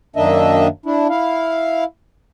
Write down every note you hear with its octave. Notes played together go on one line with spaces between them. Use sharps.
F#2 D#3 A#3 D4 D#5 E5
D4 E4
E4 F5